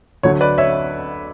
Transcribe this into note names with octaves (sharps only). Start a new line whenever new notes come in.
D2 D3 F#3 C#5
B4 D5
C#5 E5